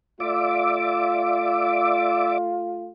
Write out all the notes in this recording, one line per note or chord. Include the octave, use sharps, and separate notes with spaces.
A3 F4 D5 E5 D6